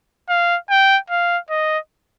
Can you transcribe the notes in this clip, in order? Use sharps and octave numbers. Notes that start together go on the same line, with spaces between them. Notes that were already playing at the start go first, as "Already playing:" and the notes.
F5
G5
F5
D#5